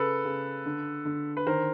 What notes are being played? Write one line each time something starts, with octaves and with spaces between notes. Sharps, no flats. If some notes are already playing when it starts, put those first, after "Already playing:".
Already playing: C#3 A4 B4
C#3
D3
D3
B4
D#3 A#4 C5